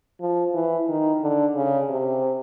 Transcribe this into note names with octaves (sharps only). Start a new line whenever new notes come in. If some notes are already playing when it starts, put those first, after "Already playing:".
F3
E3
D#3
D3
C#3
C3